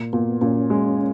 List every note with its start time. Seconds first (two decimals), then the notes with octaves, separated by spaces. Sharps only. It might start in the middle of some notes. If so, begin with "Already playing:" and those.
Already playing: A#2
0.13 A#2 B3
0.41 A#2 C#4
0.70 G#3